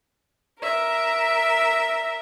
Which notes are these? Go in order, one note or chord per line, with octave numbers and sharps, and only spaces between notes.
A#4 E5